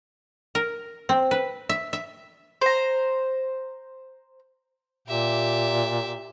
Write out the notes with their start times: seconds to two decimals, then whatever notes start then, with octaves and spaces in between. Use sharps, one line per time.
0.55 A#4
1.09 C4
1.31 B4
1.69 E5
1.93 E5
2.62 C5 A#5
5.08 A#2 G4 E5